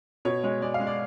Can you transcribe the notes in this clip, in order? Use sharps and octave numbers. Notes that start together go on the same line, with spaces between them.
B2 C#5
G#3 C#5
G#3 D5
F5
G#3
D5